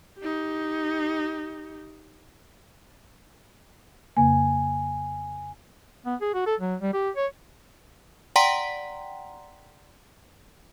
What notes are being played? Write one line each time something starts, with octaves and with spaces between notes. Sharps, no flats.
D#4 G4
F2 C#3 A#3 G#5
B3
G#4
F#4
A4
F#3
G3
G4
C#5
D5 F#5 G5 A#5 C6 B6